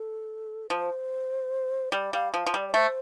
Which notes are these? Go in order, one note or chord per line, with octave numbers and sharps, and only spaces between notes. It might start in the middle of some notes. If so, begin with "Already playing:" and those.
Already playing: A4
F3 C5
G3 D5
G3 F5
F3 F5
F3
G3 D5
D5
A3 C5